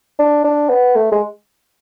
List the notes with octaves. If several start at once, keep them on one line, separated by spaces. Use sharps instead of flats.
D4
D4
B3
A3
G#3